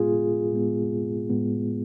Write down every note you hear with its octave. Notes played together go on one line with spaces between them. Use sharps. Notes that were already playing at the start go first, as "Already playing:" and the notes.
Already playing: A2 G#3 B3 F4 G#4
A2 G#3 B3
A2 G#3 B3